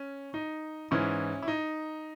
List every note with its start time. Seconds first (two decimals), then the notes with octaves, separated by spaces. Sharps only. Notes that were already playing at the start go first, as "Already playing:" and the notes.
Already playing: C#4
0.34 D#4
0.91 G#2 E3 C#4 E4
1.42 E4
1.48 D#4